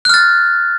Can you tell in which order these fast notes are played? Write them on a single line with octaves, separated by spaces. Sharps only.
F#6 F6 A6